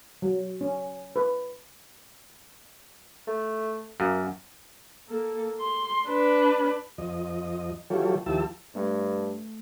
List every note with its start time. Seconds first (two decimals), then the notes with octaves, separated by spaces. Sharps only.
0.22 F#3
0.61 C#4
1.16 B4
3.27 A3
4.00 F#2 A#3
5.09 A#3 A4
5.61 C6
6.07 D4 B4
6.98 F2 D#5
7.90 E3 F#3 F4 G4 A4 C#5
8.26 D#2 F3 E4 G4 A5 E6
8.75 G2 A3